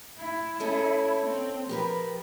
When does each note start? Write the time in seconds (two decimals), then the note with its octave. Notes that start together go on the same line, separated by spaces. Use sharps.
0.18 E4
0.60 C#4 A4 D#5
1.26 C4
1.69 F3 G4 A#4 B4